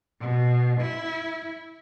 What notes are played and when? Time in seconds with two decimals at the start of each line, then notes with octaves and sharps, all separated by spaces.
0.20 B2
0.81 E4